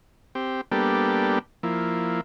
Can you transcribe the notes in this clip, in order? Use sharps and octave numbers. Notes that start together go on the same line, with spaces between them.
C4 G4
G3 A#3 B3 D4 G4 A4
F3 A#3 E4